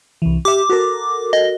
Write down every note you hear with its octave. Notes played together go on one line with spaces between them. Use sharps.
C2 E3
G4 E5 D6
F#4 A4 A#4
D#5